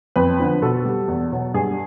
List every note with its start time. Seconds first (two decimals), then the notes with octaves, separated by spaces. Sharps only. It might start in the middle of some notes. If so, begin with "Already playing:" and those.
0.16 F2 B4
0.39 D3 F3
0.62 B2 A4
0.85 G3
1.08 E2
1.32 B2 F#3
1.54 G2 G#4